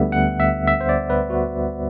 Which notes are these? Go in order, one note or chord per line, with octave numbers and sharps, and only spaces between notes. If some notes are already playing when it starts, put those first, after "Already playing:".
Already playing: D2 D3 G3 B3 E5
F#5
E5
E5
C5
D5
B4
F#4